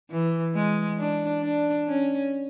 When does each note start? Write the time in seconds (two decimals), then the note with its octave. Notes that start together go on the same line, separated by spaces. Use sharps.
0.10 E3
0.55 G#3
0.99 D4
1.42 D4
1.88 C#4